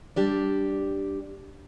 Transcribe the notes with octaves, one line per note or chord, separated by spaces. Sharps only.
G3 D4 G4 D5